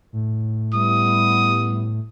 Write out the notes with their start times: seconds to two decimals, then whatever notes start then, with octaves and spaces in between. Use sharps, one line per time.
0.13 A2
0.74 G3 B3 E4 D#6